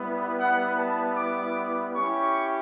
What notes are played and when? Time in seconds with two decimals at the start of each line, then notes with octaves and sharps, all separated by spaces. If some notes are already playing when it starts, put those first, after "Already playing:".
Already playing: G3 B3 E4
0.39 F#5
0.78 A5
1.17 D6
1.96 C#4 E4 G4 C#6